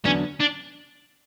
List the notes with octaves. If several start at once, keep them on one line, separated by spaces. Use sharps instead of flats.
E2 D3 F#3 B3 C#4 D4
D4